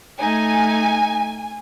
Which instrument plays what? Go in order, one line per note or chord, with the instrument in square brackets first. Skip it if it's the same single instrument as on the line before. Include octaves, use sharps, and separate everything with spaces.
[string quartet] A3 D#4 [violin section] G#5